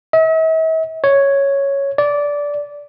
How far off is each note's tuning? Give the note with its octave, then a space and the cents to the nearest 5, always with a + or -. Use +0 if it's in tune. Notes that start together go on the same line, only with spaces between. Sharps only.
E5 -45
C#5 +0
D5 -15